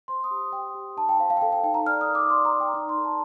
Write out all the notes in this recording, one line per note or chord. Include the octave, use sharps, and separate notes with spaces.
C5 C6
D#6
G4
G4 G5
G4
D#4 A5
G5
C5 F5
F5
G5
A4 F5
G5
D#4 G5
A#5
D5 F6
D#6
A#4
D6
D5 C6
A#5
D5
G5
D#4 A#5
C6
A4
A5